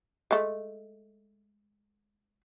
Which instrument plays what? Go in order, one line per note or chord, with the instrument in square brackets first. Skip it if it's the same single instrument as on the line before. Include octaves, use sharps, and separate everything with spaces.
[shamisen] G#3 A3